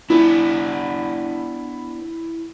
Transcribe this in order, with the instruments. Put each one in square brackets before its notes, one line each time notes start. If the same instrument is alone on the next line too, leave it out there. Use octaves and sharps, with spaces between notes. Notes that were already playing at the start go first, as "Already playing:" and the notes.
[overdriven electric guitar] B3 D4 [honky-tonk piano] E4